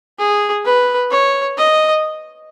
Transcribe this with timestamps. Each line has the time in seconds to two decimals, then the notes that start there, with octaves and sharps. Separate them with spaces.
0.19 G#4
0.65 B4
1.11 C#5
1.58 D#5